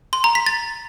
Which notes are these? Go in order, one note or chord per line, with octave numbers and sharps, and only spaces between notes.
C6
A#5
B6
A6